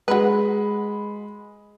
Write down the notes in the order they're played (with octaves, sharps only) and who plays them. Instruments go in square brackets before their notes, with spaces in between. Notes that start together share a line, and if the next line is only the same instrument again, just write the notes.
[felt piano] G#3 B5 [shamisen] F#4 B4